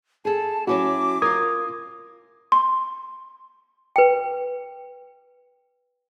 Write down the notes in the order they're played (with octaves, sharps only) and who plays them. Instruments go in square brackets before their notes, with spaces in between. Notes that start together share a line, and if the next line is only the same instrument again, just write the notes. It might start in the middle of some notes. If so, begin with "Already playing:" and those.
[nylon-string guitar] G#4 A4 [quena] A5
[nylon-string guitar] F#3 C#4 E4 [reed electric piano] F#4 [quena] D6
[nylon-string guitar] F4 A#4 [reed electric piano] D#6 G#6
[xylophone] C6
[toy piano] B4 G5